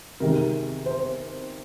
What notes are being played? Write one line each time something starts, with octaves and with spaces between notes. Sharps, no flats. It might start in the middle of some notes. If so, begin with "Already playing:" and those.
C3 D#3 G#3 A#4
C5